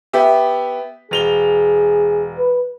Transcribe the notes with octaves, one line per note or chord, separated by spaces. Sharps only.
B3 G4 E5
E1 G#4 F7 G7
B4